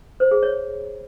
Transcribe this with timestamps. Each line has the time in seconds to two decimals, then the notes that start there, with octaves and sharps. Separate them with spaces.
0.20 C5
0.31 G#4
0.43 C#5